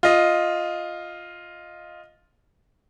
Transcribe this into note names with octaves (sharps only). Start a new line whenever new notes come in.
F4 D#5